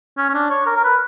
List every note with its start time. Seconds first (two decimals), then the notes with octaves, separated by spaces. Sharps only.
0.17 C#4
0.29 C#4
0.34 D4
0.50 C#5
0.66 A#4
0.76 A#4
0.84 B4